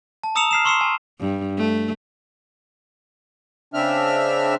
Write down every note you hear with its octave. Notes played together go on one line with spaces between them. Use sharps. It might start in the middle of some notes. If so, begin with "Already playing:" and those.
A5
A#5 D#6 E6 C#7 E7 F7
F6 C7 E7
C6 C#6 E6 C7 C#7 E7
G#5
G2
A3
C#3 C4 D4 E5 F6